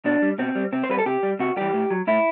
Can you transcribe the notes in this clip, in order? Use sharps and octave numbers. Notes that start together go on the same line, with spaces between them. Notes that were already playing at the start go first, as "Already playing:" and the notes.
B2 D4
G3
B2 C4
G3
C3 C4
C5
G3 B4
A4
C3 G4
G3
C3 F#4
E3 G3 G4
A2
F#3
A2 E4